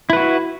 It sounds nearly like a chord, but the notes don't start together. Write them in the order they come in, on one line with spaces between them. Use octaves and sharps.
E4 B4 F#4